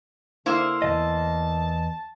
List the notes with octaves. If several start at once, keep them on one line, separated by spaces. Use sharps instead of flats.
D3 A#3 E4 C5
E2 D#3 D#5 A5